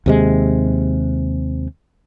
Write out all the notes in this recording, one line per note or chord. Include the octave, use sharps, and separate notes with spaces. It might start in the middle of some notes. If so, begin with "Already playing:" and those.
D#2 C3 G#3